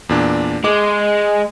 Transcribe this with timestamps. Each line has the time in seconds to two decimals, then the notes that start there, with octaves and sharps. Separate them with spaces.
0.09 E2 A#2 D4
0.64 G#3 D6